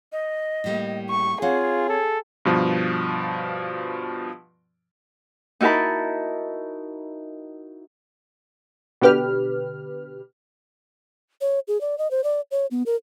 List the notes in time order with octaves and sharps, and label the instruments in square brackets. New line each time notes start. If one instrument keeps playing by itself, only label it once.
[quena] D#5
[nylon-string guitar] A2 G3 A#3
[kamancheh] C#6
[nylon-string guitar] C4 F5 F#5 [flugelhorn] F4 [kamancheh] G#4 [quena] C#5
[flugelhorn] A4
[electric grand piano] G2 B2 F3
[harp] D#4 E4 F#4 A#4 A5 B5
[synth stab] B2 D3 G4 B4 F6
[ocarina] C#5
G#4
D5
D#5
C5
D5
C#5
B3
A#4